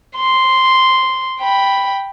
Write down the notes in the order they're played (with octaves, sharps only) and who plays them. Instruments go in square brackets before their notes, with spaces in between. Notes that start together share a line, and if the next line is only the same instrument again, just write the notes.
[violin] C6
G5 B5